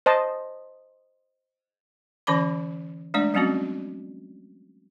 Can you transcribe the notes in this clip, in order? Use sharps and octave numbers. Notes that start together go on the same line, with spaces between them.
C5 D#5 A5
D3 E3 C#4 D5 B5 D6
G#3 A3 D4 D5
F#3 G3 A3 C4 C#4 F#4